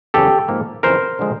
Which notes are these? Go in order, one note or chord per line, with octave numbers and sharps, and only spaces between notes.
E2 C#3 F#3 G4 A4
G#2 F3 A#3
F2 C#3 E3 A#4 C5
D3 F3 G#3